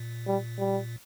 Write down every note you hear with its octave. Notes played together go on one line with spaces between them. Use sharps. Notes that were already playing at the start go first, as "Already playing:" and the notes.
Already playing: A#2
G3
G3